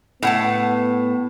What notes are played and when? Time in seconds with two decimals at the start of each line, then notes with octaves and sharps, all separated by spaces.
0.23 A2 B3 F#5 A5